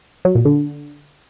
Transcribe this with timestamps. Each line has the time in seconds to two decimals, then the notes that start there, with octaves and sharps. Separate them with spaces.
0.25 F#3
0.35 A#2
0.45 D3